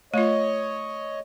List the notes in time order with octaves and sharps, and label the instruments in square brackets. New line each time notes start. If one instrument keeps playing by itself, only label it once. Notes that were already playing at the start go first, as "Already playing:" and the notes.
[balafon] A3 F4 [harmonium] C#5 D#5